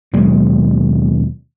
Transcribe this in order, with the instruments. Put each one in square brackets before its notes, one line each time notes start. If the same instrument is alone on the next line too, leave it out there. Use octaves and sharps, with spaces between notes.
[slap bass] D#2 B2 F#3 G#3